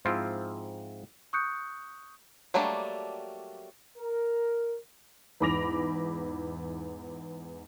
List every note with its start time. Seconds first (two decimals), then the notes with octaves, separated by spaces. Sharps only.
0.05 G#2 F3 C4 E4 F4
1.33 C#6 D#6 F#6 G6 C#7
2.54 F#3 G3 A3 A#3 D4
3.98 A#4
5.40 E2 G#2 B5 D6 A#6 F7